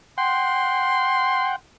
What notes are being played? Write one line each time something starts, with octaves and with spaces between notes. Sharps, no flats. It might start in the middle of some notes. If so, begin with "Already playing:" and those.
F#5 G5 C6